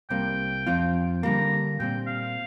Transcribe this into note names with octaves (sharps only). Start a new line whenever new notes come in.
C2 C3 G3 A#3 G5
F2 F3 C4 F4
D3 G3 A#3 A#5
A#2 G3 C4 G5
F5